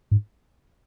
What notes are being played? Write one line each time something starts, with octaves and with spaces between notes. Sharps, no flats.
G#2